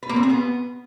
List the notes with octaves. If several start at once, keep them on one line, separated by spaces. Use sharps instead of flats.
B4
A#3
C4
G#4
B3